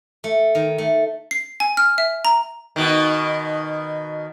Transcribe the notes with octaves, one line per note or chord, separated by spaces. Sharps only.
A3
D#3
A3
C7
G#5
F6
E5
A#5
B2 D#3